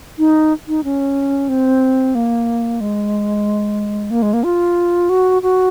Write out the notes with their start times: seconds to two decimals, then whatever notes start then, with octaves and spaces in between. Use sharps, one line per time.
0.19 D#4
0.68 D#4
0.84 C#4
1.49 C4
2.15 A#3
2.81 G#3
4.11 A#3
4.22 G#3
4.33 A#3
4.44 F4
5.09 F#4
5.42 F#4